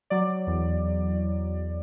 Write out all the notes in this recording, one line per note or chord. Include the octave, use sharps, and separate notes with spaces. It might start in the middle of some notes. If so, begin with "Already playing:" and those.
F#3 D5
E2